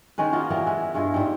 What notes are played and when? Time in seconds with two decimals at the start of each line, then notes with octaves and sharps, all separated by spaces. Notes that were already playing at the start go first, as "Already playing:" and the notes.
0.18 D#3 G#3 C#4 B4
0.33 A#3 B3 F4 F#4
0.50 E3 G3 B3 A#4
0.66 G#3 E5
0.94 G2 G#3 E4 F4
1.14 G#2 G3